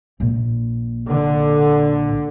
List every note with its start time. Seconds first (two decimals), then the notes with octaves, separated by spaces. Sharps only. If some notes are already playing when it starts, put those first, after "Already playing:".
0.20 A#1 A#2
1.08 D3